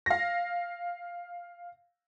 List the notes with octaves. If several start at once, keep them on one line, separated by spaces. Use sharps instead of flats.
F5 A#6